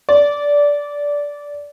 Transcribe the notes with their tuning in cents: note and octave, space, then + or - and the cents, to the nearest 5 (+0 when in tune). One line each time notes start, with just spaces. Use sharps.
D5 -15